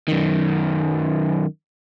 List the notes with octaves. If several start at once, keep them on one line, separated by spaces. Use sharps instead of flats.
F#2 D#3